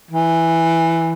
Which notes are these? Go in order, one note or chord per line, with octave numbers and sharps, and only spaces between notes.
E3